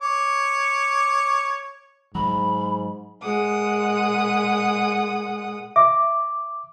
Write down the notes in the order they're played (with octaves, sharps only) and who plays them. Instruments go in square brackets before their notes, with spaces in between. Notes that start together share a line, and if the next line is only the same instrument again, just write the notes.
[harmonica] C#5 D6
[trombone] G#2 [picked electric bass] F#3 [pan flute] B5
[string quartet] A#2 G#3 F#5 D#6
[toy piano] E5 [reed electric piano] D6